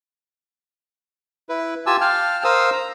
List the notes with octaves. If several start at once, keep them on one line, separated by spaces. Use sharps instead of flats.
E4 B4
F4 G4 G#5 A5 E6
F5 G5 A5 F6
A#4 C5 F5 D#6 E6
A#5